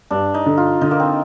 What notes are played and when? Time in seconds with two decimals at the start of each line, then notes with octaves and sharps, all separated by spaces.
0.11 G2 D4
0.34 D#4
0.46 D3
0.57 F4
0.81 D3 D#4
0.91 A#3
1.00 C4